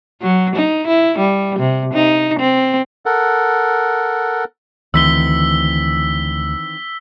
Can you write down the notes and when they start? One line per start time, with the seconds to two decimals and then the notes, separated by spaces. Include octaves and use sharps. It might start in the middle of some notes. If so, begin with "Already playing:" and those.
0.22 F#3
0.56 D#4
0.87 E4
1.18 G3
1.59 C3
1.94 D#4
2.39 C4
3.06 A4 A#4 F#5
4.94 D2 D#3 E3 C4 E6 B6 G7